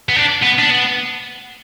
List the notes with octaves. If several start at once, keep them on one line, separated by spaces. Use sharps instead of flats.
B3
D4
B3
D4
B3